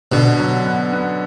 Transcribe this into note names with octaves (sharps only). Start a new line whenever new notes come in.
B2 D3
F#3
B3
B3